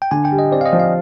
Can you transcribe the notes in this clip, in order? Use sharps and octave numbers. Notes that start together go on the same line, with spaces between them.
G5
D3 G#5
G5
G3
D#5
C4 D5
F5
D#5
F3
F5